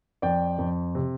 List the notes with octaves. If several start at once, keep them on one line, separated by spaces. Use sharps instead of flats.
F2 D5 G5
F2
C3